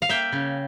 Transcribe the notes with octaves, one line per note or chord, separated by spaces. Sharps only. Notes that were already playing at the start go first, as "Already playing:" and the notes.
F5
A#3 E5 G5
C#3